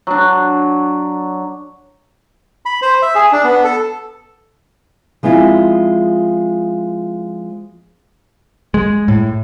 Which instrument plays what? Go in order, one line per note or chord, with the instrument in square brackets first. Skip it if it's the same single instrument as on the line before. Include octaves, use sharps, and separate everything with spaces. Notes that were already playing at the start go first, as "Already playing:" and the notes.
[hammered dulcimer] F#3 D4
[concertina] B5
C5
E5
G#4
D4
B3
A4
[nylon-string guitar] F3 G#3 C4 E4 F4
[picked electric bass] G#3
A2